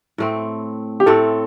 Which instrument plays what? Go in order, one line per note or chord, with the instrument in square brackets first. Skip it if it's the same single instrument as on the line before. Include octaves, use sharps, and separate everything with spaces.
[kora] A2 A3 C4
[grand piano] G4
[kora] A2 A3 C4 [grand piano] A4